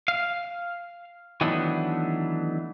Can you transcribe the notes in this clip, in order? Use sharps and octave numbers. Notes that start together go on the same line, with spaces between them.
F5
D#3 E3 F#3 A3 B3 D4